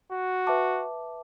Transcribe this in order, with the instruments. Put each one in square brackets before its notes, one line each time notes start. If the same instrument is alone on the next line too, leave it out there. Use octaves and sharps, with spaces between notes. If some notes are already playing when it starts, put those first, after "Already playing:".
[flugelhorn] F#4
[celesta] B4 E5 A5 D6